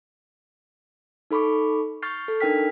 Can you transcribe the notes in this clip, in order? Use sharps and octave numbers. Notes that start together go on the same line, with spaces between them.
D#4 A4 B5 C#6 D6
C#6 F6 G6 A6 C7
A4
D4 D#4 A#4 G5 F6 B6